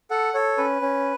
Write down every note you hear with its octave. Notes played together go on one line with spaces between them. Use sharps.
A4 F#5
A4 C#5
C#4 B4
C#4